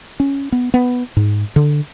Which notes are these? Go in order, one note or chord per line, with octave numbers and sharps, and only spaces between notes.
C#4
B3
B3
G#2
D3